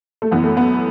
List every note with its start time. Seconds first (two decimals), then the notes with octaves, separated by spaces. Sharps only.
0.22 A3
0.31 F#2 E3 B3
0.44 A3
0.57 B3